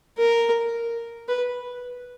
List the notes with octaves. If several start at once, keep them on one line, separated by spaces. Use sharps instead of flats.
A#4
B4